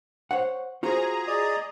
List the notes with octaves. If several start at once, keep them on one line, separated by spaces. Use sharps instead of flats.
C5 C#5 F#5
F4 F#4 G#4 C5 A#5
D5 D#5 D#6